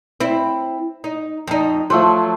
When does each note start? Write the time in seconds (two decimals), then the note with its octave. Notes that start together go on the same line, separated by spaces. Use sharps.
0.20 C4 E4
1.04 D#4
1.48 F2 D#4
1.90 F3 F#3 A3 C5